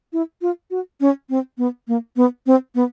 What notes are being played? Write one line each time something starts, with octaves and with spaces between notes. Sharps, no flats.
E4
F4
F#4
C#4
C4
B3
A#3
B3
C4
B3